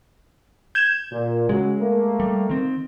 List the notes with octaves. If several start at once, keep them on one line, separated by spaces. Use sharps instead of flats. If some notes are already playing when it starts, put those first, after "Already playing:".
G6 G#6 E7
A#2
C#3 F#3 G#3
A3 A#3
G3
D#3 C4